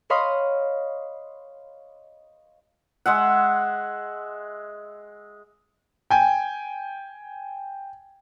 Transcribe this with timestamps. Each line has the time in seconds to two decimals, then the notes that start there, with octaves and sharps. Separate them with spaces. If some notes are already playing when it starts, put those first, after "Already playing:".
0.10 C#5 D#5 F5 B5 C6 D#6
3.06 G#3 E5 F#5
6.10 G5 G#5